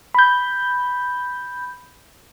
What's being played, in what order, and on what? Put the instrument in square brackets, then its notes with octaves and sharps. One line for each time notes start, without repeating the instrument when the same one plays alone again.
[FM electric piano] B5 G6